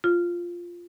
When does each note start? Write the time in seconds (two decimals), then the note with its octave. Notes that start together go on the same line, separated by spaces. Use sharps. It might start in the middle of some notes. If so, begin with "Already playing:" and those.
0.04 F4